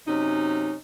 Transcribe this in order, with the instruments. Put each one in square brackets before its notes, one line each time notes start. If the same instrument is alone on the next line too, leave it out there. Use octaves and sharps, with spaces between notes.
[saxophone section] F#2 C3 C#4 D#4